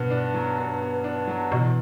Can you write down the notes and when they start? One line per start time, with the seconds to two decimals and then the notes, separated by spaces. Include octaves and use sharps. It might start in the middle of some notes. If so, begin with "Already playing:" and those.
Already playing: G2 B2 B3
0.10 D4
0.34 F#3
0.58 G2
0.82 B3
1.04 D4
1.27 F#3
1.51 E2 B2